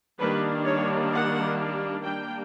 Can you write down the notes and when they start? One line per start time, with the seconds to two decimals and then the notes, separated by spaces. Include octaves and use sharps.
0.20 D#3 G3 A#3 D4 B4
0.66 C#5
1.12 F#5
2.03 G3 A#3 D4 G5